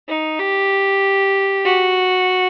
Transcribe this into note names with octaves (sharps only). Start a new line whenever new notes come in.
D#4
G4
F#4